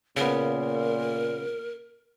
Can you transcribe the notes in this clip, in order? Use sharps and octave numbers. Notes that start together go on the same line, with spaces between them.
A#2 C#3 B3 A#4